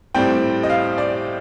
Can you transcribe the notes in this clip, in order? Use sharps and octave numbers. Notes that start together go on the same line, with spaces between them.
A2 G3 C4 G5
D#5
F5
D5